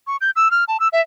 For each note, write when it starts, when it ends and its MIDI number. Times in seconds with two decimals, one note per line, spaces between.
0.07 0.17 85
0.21 0.31 91
0.36 0.51 88
0.51 0.64 89
0.68 0.80 81
0.80 0.88 88
0.93 1.01 76